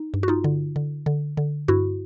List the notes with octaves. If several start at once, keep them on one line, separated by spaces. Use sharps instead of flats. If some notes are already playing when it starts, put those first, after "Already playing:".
Already playing: D#4
G2
F#4
D#4 F4
D3
D3
D3
D3
G2 E4 F#4